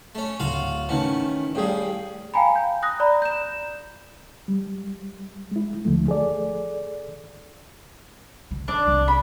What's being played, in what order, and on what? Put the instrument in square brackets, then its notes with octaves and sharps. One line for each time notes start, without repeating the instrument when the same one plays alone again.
[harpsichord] A3 C#4
[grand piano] D1 [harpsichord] F4 F#4 F5
[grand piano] D#3 C#4 F#5 [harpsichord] E3 A3
[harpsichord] A2 G3 [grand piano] G#4 F5 G5
[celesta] F5 G5 G#5 A#5 B5
G6
D#6 F#6 A#6
D5 A#5 B5
G6 E7
[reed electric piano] G3
G#3 E4
D2 D3 F3 A3
G#4 A4 D5
[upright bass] D3
[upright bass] D#3 [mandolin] D4 D5
[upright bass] C2
[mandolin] B5